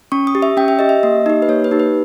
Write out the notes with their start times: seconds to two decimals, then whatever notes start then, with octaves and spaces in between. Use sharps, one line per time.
0.12 C#4 C#6
0.27 D#6
0.35 G4
0.42 E5
0.57 C#4 G5
0.68 E5
0.79 G4 D#5
0.89 E5
1.03 A#3 D#5
1.26 D#4 G4
1.42 B4
1.49 A#3 C#5
1.64 B4
1.71 D#4 G4
1.80 B4